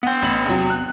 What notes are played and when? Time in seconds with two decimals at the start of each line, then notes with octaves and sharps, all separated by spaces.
0.03 B3 F#5 G5
0.22 A1 B5 F#7
0.46 E2 C3 F#3
0.70 F#6